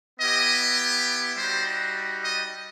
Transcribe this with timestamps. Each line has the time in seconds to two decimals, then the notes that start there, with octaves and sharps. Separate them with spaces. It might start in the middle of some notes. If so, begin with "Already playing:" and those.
0.20 B3 E4 G4 D#5
1.36 G3 D#4 F#4 C5
2.24 D#5